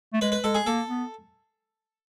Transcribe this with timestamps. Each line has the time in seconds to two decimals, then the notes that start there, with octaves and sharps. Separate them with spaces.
0.13 A3
0.21 G#3 B4
0.32 B4
0.44 G#3 A4
0.55 G#4
0.66 A#3 A4
0.88 B3